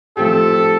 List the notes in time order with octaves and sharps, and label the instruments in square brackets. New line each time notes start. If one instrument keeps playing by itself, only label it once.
[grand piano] F3 A3 C4 G4 [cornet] A4